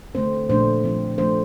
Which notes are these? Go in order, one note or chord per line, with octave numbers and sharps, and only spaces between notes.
D3 A3 C4 C5
A#2 F3 A3 D4 C5
F3 C4
F3 A3 D4 C5